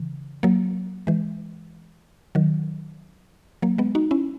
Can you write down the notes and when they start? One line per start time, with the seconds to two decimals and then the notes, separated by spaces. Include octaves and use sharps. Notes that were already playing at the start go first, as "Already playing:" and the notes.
Already playing: C#3 E3
0.43 F#3 A#3
1.07 E3 G#3
2.35 D#3 F#3
3.62 F#3 A#3
3.78 G#3 B3
3.95 D#4 F#4
4.11 C#4 E4